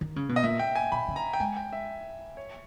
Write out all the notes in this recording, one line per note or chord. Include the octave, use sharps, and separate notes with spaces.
D#3
C#3
B2
D#5
A#2 E5
G5
G#5
B2 B5
C#3
A#5
G5
G#3 G#5
G5
E5
C#5